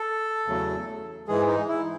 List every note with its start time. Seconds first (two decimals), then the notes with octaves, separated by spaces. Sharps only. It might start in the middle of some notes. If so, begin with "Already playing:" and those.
Already playing: A4
0.47 E2 C#3 F#3 A3
1.27 G#2 E3 G#3 G#4
1.48 D#4
1.68 E4